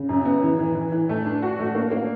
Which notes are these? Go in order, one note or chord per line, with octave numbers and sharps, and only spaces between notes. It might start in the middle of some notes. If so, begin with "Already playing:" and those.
Already playing: C#3
F#2
B3
E3
E3
E3
E3
A3
D4
F#4
A3
A#3
A#3